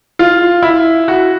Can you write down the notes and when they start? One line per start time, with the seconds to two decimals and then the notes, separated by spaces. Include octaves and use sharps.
0.19 F4
0.63 E4
1.08 F#4